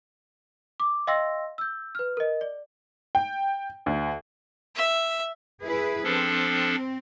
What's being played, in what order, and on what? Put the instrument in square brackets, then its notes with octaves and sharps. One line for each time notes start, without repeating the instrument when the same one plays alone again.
[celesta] D6
D#5 F5 G5 C6 E6 A#6
E6 G6
B4 F6
A#4 D#5
D5
[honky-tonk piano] G5
D2
[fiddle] E5
[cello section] E4 G#4 B4
[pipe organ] F3 D4 A4 [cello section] C4